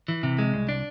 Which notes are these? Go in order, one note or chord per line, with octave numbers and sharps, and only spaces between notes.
E3
C3
G#3
C2
D4